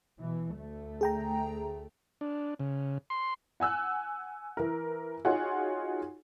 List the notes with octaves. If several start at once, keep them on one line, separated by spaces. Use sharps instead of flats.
B2 E3
D2 A3
G#4 G5 A#5
D4
C#3
C6
F#5 G#5 E6 F#6
E3 A#4
D#4 F4 F#4 G#4 C#5 F#5